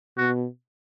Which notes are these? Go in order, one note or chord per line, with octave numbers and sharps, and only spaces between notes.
B2 F#4